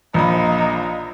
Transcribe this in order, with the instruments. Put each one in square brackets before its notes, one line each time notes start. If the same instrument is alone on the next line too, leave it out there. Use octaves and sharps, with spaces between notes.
[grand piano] A#1 F3 B5 [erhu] D#4